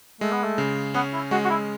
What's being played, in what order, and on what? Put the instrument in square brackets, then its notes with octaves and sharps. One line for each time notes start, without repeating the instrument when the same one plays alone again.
[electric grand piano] G#3 [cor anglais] A3
[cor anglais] B3
A3
[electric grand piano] C#3
[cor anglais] B3 [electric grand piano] C#4
[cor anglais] E4
[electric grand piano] G#3 [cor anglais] F#4
[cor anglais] F#4
E4